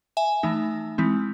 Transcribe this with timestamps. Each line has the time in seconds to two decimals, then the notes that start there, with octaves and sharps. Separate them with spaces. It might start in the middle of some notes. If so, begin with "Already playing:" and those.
0.17 E5 G#5
0.43 E3 A3 D#4
0.98 E3 G#3 C4 E4